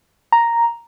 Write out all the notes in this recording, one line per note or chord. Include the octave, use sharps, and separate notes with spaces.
A#5